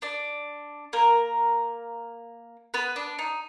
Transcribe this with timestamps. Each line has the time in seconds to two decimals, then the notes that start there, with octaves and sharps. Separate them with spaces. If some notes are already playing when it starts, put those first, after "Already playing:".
0.02 D4 D5
0.93 A#3 A#4
2.74 B3 B4
2.96 D4
3.19 D#4